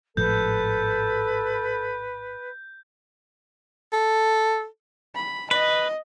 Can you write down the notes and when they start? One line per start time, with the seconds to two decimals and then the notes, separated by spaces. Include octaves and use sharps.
0.17 G#1 A2 F3 A4 B4 G6
3.93 A4
5.15 B5
5.51 B4 D#5